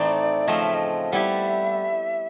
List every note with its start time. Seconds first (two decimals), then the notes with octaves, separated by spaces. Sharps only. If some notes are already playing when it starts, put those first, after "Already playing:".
Already playing: A2 E3 A3 C4 D#4 D5
0.48 C#3 F3 A3 C4 D#5
0.61 E5
0.74 D#5
1.12 G3 B3 E4 G4 E5 F#5